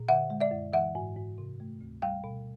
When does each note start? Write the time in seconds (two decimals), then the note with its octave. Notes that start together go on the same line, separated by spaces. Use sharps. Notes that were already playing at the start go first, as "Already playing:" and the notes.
Already playing: A#2
0.09 D3 E5 F#5
0.30 G#3
0.40 D5 E5
0.51 F#2
0.73 E3 E5 F#5
0.95 G#2
1.17 G#2
1.38 C3
1.60 A3
1.81 D2
2.02 G3 F5 G5
2.24 B2